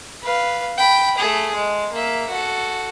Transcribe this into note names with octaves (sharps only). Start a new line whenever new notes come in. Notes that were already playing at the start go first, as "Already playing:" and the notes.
B4 F5
G5 B5
A3 G#4
G#3
A#3 E5
F#4 A4